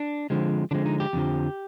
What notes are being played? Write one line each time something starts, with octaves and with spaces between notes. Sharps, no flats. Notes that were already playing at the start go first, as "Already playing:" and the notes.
Already playing: D4
D3 F3 G#3 C4
D3 F3 G#3 C4 D4
D#4
G4
F2 D3 F3